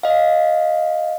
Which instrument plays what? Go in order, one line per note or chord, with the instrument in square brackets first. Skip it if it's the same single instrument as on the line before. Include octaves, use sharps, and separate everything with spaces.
[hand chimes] D#5 F5